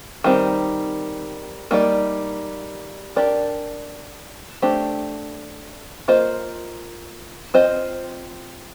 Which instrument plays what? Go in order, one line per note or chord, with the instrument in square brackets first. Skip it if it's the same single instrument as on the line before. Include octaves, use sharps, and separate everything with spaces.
[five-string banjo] D#3 G3 C4
G3 A#3 D#4 A#4 D5
D4 G4 A#4 D5
A3 D4 G4 C5
A#3 F4 C5 D#5
C4 F4 C5 D#5